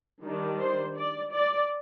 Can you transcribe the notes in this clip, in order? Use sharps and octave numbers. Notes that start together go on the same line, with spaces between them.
D#3 G3 D4
C5
D5
D5